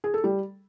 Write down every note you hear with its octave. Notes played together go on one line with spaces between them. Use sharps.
G#4
A4
G3